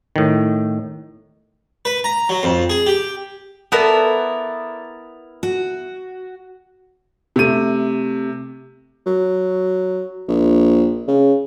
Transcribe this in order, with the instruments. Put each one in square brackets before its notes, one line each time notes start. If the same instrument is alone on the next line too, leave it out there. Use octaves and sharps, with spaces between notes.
[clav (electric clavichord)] A2 D#3
[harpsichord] B4
A#5
F#3
F2
G#4
G4
[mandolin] B3 E4 A#4 [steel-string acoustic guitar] A4 D5
[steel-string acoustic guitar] F#4
[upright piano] C3 A3 D#7
[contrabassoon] F#3
A#1
C#3